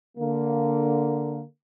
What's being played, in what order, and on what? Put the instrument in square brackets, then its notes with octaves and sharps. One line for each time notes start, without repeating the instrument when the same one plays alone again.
[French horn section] D3 A#3